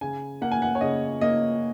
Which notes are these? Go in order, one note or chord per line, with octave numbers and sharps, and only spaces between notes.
C#3 G#5
A#3 F#5
G#5
F#5
C#5
C#3 D#5
A#3 D#5